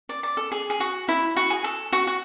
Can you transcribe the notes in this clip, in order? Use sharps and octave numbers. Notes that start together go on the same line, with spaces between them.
D5
D5
A4
G#4
G#4
F#4
E4
F#4
G#4
A4
F#4
F#4